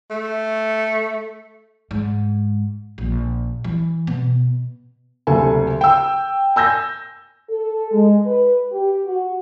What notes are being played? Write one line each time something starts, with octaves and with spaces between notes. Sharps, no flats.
A3
G#2
A#1
E3
B2
F#1 D2 C3 A3 A4 G#5
G5 E6
G#5 E6 G6 A#6
A4
G#3
B4
G4
F#4